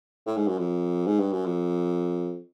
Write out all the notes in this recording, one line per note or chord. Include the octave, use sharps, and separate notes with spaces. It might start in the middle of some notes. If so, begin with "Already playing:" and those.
A2
G#2
F#2
F2
G#2
G2
F#2
F2